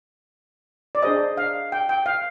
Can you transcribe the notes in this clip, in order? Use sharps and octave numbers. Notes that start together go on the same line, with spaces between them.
D5
D4 G#4 C5 D#5
F5
G5
G5
F5